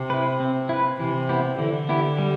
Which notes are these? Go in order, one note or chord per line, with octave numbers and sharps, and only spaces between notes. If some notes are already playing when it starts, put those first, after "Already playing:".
Already playing: C3
E4 B4
C4
E4 B4
C3 E3
B3 E4 G4
D3 E3
B3 E4 G4
G3